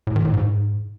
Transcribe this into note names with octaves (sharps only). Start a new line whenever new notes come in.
A2
D#3
A2
G#2